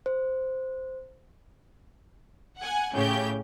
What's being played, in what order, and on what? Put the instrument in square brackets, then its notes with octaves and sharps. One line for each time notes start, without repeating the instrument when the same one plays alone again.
[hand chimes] C5
[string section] F#5 G#5
A2 C#3 G4 G6